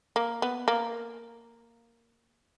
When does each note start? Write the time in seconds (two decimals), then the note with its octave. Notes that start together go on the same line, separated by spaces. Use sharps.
0.16 A#3
0.42 B3
0.68 A#3